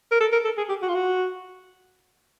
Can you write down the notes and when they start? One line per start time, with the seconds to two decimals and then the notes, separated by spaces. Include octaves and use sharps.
0.11 A#4
0.20 A4
0.32 A#4
0.44 A4
0.57 G#4
0.69 G4
0.82 F#4
0.88 F4
0.94 F#4